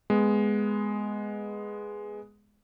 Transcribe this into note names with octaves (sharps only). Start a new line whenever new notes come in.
G#3 B3